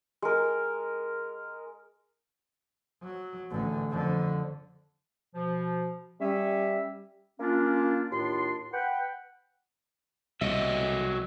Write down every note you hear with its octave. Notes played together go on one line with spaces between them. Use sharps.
G#3 A#4
F#3
A1 D3
F2 D3
B2 F3
G3 C#4 E5
A#3 C#4 D4 F4
D#2 A2 D4 F4 C6
B4 F#5 G5
C2 B2 F#3 D#5 E5